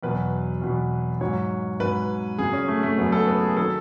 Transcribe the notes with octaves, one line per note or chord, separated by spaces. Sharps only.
E2 B2 F#3 B4
E2 B2 F#3
G#2 F#3 C#5
G#2 F#3 B4
F#2 C#3 F#3 G#4
C#4
A3
A3
F#2 C#3 F#3 B3
A4
B4
G#4
D#3 F#3 A4